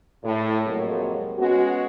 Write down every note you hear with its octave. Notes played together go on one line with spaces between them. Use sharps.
A2
F2 C3 F#3 G#3 A#3
G#3 B3 C#4 F#4